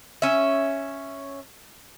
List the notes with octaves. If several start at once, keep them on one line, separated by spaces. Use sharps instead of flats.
C#4 E5